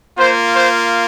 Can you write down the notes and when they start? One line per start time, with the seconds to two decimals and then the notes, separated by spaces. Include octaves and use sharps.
0.18 A#3 F4 C5
0.56 C5